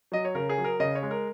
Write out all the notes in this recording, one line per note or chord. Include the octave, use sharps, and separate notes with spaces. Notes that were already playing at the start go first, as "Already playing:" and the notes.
F#3 D#5
C#5
C#3 A#4
G#4
F#3
A#4
C#3 D#5
C#5
G#3
A#4